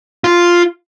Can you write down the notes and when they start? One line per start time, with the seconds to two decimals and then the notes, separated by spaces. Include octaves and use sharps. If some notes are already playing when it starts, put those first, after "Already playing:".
0.24 F4